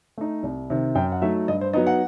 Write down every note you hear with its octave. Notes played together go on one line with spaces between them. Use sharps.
A3 D#4
C2
C3 D#3
F#2 G5
F#5
F#3 A3 D#4 E5
G2 D#5
C5
F#3 B3 D#4 D#5
F#5